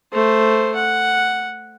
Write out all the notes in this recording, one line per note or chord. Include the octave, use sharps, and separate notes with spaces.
A3 C5
F#5